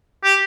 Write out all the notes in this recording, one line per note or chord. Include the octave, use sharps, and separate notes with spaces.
G4